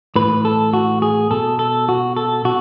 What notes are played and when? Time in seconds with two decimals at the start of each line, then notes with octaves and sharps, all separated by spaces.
0.16 A2 E3 B4
0.45 A4
0.73 F#4
1.02 G#4
1.31 B2 A4
1.59 A4
1.89 F#4
2.17 A4
2.45 B2 F#4